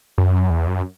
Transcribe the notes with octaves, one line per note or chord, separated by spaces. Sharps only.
F#2
E2
F#2